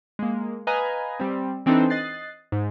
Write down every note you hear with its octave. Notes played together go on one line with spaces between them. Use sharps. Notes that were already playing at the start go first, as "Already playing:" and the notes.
G#3 A#3
B4 D#5 F5 G#5 A#5
G3 C4
E3 C4 D4 D#4 A4
D#5 F#6 A6 C7
G#2